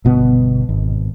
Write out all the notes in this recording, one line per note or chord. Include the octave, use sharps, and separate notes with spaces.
G1 B2 B3
G#1